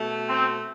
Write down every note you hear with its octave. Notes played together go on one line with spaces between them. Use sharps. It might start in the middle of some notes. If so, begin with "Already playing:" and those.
Already playing: B2 A3
C4